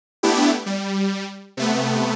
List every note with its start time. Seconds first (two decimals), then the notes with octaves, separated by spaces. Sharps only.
0.23 A3 B3 D4 E4 G4
0.66 G3
1.57 C3 A3 B3